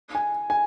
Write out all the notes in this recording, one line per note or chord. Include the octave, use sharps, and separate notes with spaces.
G#5
G#5